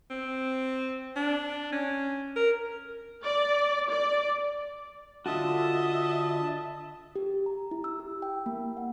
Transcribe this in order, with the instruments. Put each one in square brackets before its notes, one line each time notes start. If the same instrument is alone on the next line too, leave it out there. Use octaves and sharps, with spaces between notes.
[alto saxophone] C4
D4
C#4
A#4
[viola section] D5
D5
[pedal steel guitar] D3 F4 F#4 [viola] D#5 E5 [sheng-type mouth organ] A5
[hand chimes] G4
A#5
E4
E6
G4
G5
A#3
F#5